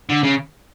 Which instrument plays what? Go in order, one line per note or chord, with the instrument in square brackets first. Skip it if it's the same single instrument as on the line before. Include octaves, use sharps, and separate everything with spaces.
[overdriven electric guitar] D3
C#3